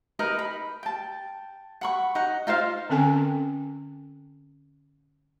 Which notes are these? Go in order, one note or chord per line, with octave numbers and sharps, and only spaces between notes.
D#4 A#4 B4 D#5
B5
G5 A5
F#5 B5 C#6
D#4 F#5
D#4 F4 C5 F5
D3 C4 C#4 A4 G5 G#5